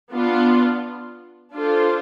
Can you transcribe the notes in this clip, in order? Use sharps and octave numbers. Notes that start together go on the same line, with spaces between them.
B3 D4 F4
D4 F4 A4 C5